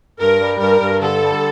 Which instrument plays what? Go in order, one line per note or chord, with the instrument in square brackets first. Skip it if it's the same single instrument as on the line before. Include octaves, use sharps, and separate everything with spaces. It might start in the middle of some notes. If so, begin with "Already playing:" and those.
[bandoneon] G2 [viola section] A#4
[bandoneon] G3
[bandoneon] G2 [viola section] A#4
[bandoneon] G2
[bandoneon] D3 [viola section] A4
[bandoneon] G3